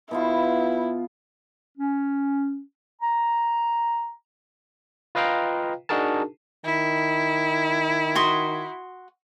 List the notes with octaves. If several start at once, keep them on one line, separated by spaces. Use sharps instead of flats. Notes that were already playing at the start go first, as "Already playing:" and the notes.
B2 B3 E4 F4
C#4
A#5
F4 B4 D#5 F5 G5 A#5
D4 D#4 F#4 G#4 A#4 A5
D#3 E4
F#4 C6 D#6